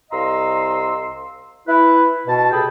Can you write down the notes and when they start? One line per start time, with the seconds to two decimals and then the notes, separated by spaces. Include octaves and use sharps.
0.11 C2 D#5 F5 A#5 C6 E6
1.67 E4 B4
2.27 B2 A5
2.52 C#2 C3 G#4 A4 G5 B5